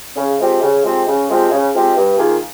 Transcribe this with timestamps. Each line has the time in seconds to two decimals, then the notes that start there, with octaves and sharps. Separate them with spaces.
0.16 C#3
0.39 F3 G#3 C4 G4
0.62 C#3
0.84 F3 G#3 C4 G4
1.07 C#3
1.29 F3 G#3 C4 G4
1.51 C#3
1.73 F3 G#3 C4 G4
1.96 G2
2.18 D#3 A#3 F4 G#4